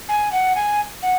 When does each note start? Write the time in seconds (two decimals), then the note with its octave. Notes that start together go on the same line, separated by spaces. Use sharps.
0.09 G#5
0.32 F#5
0.56 G#5
1.02 F#5